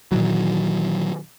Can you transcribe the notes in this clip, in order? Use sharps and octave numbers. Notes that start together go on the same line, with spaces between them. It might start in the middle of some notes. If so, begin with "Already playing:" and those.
A#2 D#3 E3 F#3